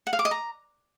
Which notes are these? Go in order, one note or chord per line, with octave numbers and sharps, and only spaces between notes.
F#5
F5
D6
D#5
A#5